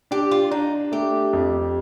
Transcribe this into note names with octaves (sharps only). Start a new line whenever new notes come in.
D4 G4
F4
D4 D#4
A3 G4
F2